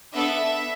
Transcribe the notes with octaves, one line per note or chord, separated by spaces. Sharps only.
B3 D4 A4 E5